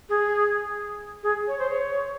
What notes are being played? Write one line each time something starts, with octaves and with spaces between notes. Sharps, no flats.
G#4
G#4
C#5
C5
C#5